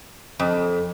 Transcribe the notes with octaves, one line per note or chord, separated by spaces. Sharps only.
F2